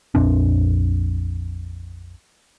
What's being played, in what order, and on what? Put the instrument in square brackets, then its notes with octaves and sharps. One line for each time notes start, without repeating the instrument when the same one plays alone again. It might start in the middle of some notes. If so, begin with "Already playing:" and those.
[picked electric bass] A#1 F2 C4 D4